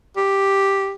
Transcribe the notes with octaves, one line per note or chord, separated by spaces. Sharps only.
G4